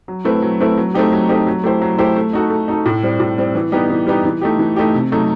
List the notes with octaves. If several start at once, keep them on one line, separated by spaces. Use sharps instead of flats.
F#3
A3 C4 E4 B4
F#3
A3 C4 E4 B4
F#3
A3 C4 D#4 G4
F#3
A3 C4 D#4 G4
F#3
A3 E4 G4 C5
F#3
A3 E4 G4 C5
A3
D#4 F#4 A4
A3
D#4 F#4 A4
A2
G3 C4
A2
G3 C4
E3
G3 B3 D#4 G4
E3
G3 B3 D#4 G4
E3
A3 D#4 G4
E3
A3 D#4 G4
C3
F#3 A3 D#4